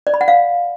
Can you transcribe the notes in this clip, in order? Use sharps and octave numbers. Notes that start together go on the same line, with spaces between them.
D5
B5
F#5
F5